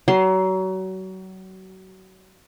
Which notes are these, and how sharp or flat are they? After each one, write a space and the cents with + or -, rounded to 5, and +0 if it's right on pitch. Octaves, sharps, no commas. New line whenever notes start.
F#3 +30 C6 +0